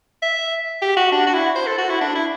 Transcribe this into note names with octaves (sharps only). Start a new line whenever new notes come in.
E5
G4
F#4
D4
F#4
E4
C5
A4
F#4
E4
D4
E4